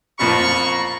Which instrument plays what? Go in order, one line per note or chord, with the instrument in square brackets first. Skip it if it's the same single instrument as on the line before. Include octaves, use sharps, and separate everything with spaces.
[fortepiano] A1 F2 A#2 [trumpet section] A#5 B5 C#6